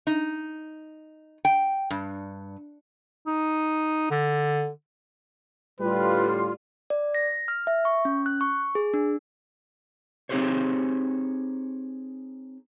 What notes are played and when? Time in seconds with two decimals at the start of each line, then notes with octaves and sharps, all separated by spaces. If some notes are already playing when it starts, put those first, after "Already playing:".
0.07 D#4
1.45 G5
1.90 G2
3.26 D#4
4.11 D3
5.81 A2 D3 G3 F4 B4
6.90 D5
7.15 A#6
7.48 F6
7.67 E5
7.85 C#6
8.05 C#4
8.26 F#6
8.41 C#6
8.75 G#4
8.94 D4
10.29 C4 D#4 G4 G#4 C5 C#5